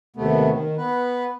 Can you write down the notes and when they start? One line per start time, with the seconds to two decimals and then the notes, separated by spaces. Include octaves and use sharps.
0.16 D#2 C3 A3 B3
0.50 D#3
0.78 B3 B4